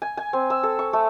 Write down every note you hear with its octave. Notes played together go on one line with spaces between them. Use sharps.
G#5
G#5
C4
E6
A4
C#6
A3